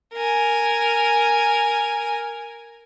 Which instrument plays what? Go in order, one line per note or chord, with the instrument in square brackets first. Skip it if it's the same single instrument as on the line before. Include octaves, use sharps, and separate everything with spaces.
[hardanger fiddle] A#4 G#5